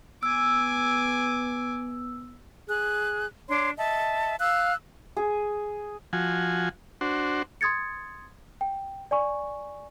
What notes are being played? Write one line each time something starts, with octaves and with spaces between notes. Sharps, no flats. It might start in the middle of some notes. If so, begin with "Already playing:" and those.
B3 G#5 D6 E6
G#4 F#6
D4 C#5 C6 D6
D#5 E5 A5
F5 E6 F#6
G#4
F3 F#4 G#5
D4 F#4 C5
C6 D#6 G#6 A6 C#7
G5
D5 G#5 C#6